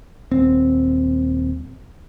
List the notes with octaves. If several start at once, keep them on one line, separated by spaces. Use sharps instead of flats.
D#1 C4